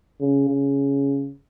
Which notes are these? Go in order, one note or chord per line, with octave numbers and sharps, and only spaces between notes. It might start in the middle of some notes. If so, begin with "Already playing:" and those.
C#3
C#3